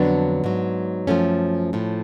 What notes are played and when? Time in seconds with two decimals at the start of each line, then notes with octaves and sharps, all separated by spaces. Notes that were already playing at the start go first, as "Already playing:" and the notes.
Already playing: F2 D3 F#3 B3 D4
0.44 G#2 F#3
1.07 F#2 F3 A3 C#4
1.73 A2 F3